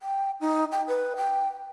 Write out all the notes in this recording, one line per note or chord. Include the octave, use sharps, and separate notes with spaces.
G5
D#4
G5
B4
G5